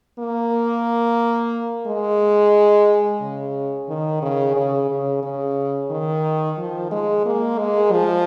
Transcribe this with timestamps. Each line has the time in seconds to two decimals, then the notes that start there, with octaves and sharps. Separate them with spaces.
0.19 A#3
1.87 G#3
3.21 C#3
3.89 D#3
4.22 C#3
4.56 C#3
4.90 C#3
5.23 C#3
5.90 D#3
6.58 F3
6.92 G#3
7.26 A#3
7.59 G#3
7.92 F3